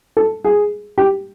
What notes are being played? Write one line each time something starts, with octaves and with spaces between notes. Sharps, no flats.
A4
G#4
G4